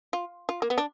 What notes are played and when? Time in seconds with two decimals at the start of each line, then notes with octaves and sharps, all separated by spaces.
0.13 F4
0.49 F4
0.62 A#3
0.70 B3
0.78 D4